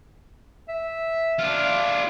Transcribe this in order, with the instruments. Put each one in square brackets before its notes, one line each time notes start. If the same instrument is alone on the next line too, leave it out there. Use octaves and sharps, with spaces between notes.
[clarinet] E5
[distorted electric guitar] D4 F4
[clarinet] F5